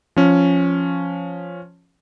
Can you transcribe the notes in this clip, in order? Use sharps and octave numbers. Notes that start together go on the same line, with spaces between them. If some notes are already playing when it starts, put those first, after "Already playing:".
F3 C#4